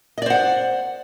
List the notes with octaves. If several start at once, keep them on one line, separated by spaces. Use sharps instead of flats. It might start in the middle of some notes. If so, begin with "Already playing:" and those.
C5 D5 D#5 F#5